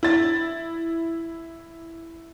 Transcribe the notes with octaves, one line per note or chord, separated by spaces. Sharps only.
E4 A6